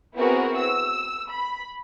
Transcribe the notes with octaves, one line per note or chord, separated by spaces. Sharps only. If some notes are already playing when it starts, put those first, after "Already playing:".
B3 C4 E4 F#4 G#4 A#4
E6
B5